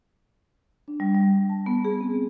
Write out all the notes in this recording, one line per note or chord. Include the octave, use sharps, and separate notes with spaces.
D4
G3
G3
A5
B3
G#4
C4